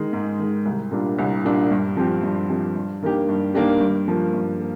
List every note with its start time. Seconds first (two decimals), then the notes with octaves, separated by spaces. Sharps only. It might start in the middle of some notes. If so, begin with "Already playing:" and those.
Already playing: D#3 G#3
0.13 G#2
0.39 D#3 G#3
0.66 C2
0.91 A#2 G3 D4
1.19 C2
1.45 A#2 G3 D4
1.71 G2
1.97 F3 C4 G4
2.23 G2
2.49 F3 C4 G4
2.76 G2
3.02 D#3 A#3 D4 G4
3.29 G2
3.54 D#3 A#3 D4 G4
3.81 G2
4.08 F3 A#3
4.34 G2
4.60 A#3